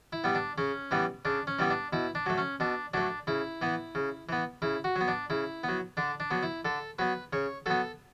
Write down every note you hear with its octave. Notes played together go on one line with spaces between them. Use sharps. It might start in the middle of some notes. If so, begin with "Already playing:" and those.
E4
G3 B3
D4
C#3 C#4
E3 G3 B3
C#3 D4
C#4
E3 G3 B3
D4
B2 E4
D4
F#3 A3
C#4
B2 D4
F#3 A3 D4
C#3 E4
E3 B3
C#3
E3 B3
C#3 E4
F#4
F#3
B3
D4
C#3 E4
F#3 B3
D3 D4
D4
F#3 B3
E4
D3 A4
F#3 B3 B4
C#3 C#5
F#3 B3 A4